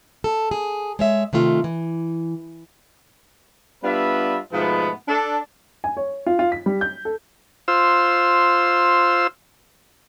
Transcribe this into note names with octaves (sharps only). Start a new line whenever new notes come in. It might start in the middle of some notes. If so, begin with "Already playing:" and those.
A4
G#4
G#3 C#5 E5
C3 D#3 A3 F4
E3
G3 B3 D4 F4 B4 E5
G#2 B2 F3 A3 B3
D4 A4
G#5
C#5
F4
F4
B6
G3
G6
A4
F4 C5 E6